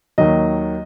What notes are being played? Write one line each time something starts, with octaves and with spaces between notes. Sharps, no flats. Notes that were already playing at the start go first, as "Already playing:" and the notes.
D#2 D#3 F#3 D#5